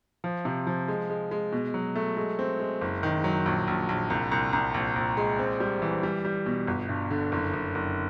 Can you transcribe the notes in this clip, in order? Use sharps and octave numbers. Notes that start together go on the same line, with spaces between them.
F3
C3
F3
G#3
G#3
G#3
B2
F#3
A3
G#3
C4
G#3
F#1
D#3
F#3
A#1
A#1
A#1
C2
C2
C2
A#1
A#1
G#3
C4
G3
E3
G3
G3
B2
G1
G2
D3
F#1
F#1
F#1